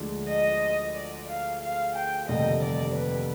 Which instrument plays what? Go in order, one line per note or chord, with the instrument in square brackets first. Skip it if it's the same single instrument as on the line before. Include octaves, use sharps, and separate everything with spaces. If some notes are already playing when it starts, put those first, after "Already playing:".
Already playing: [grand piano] D2 D3 F3 G#3 D4
[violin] D#5
D5
F5
F5
G5
[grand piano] F1 D#2 D3 G3 [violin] D#5
[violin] D5
B4